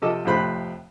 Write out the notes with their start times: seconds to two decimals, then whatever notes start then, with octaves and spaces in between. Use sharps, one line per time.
0.02 C3 F3 A4 D#5 D6 E6
0.25 F2 A2 C3 C5 B5 F#6